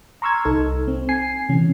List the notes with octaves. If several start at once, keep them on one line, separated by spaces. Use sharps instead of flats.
A#5 C6 C#6 E6 F6 G#6
C2 D#4 A4
C4
G#5 C7
C3 E3 C#4